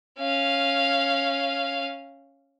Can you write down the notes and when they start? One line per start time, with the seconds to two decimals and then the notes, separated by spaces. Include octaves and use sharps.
0.19 C#4 F5